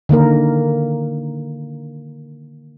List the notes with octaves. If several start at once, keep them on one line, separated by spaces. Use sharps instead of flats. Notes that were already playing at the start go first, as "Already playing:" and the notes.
D3 D#3 A#3 A#4